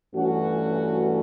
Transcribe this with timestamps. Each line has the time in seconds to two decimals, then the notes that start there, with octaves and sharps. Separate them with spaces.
0.15 G2 E3 A3 C#4 F#4